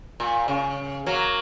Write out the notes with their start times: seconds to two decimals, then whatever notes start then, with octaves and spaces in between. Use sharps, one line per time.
0.20 A#2
0.48 C#3
1.06 F#3 A#3